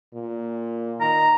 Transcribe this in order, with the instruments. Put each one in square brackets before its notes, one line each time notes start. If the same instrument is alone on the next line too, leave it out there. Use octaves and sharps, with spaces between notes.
[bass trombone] A#2
[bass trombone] D#3 [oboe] A#5